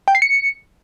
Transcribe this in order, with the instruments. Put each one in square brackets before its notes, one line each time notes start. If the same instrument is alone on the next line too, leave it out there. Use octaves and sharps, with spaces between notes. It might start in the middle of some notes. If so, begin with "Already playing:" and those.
[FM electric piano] G5
C7
C#7